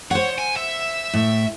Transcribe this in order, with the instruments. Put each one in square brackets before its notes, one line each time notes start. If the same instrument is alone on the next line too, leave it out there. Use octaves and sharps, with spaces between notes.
[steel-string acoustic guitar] C5 F#5 [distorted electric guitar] C#5
[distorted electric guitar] G#5
E5
[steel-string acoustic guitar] A2